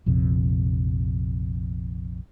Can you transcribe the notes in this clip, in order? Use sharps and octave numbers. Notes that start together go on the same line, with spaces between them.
A#1 F2 C3